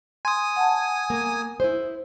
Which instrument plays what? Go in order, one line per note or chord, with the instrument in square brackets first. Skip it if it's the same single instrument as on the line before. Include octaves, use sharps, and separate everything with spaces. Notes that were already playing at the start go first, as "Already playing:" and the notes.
[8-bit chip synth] G#5 D#6 [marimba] C6
[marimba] F#5 A5
[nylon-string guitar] A#3
E4 C5